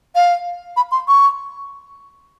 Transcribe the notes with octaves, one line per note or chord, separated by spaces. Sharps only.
F5
B5
C6
C#6